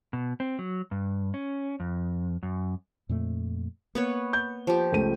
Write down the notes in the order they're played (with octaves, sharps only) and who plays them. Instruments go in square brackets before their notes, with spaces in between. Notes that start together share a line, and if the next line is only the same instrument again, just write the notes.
[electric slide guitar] B2
C4
F#3
G2
C#4
F2
F#2
[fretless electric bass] F2 A#2 A3
[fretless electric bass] A#3 [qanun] B3 B4 C#5
[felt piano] G6
[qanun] F3 G4
[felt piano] C#2 A3 D#7